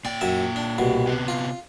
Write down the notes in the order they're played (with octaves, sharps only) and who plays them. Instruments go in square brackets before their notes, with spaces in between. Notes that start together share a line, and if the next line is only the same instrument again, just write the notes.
[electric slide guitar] A#2 G5 [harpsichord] D5
[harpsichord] F#2 E5
D4
C2 B2
[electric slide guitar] C3 B3
[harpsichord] F4